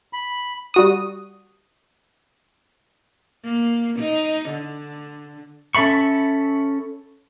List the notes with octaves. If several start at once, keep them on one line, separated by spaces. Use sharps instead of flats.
B5
G3 F#4 D#6
A#3
D#4
D3
C#4 A4 E5 B5 C#6